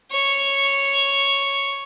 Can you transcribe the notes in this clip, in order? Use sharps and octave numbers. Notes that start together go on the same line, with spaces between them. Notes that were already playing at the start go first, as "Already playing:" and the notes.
C#5